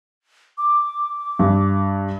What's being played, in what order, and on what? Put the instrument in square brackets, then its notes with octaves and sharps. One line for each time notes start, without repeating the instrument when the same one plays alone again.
[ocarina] D6
[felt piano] G2